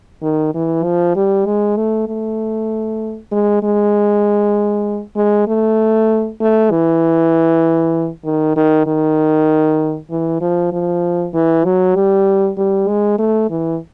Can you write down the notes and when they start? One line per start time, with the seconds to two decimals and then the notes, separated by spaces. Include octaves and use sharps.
0.22 D#3
0.54 E3
0.84 F3
1.16 G3
1.46 G#3
1.77 A3
2.08 A3
3.32 G#3
3.63 G#3
5.16 G#3
5.48 A3
6.41 A3
6.71 E3
8.25 D#3
8.56 D#3
8.87 D#3
10.11 E3
10.41 F3
10.72 F3
11.33 E3
11.65 F#3
11.95 G3
12.58 G3
12.88 G#3
13.18 A3
13.50 E3